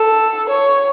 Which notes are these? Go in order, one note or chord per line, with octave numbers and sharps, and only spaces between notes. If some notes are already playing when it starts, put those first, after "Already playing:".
Already playing: A4
C#5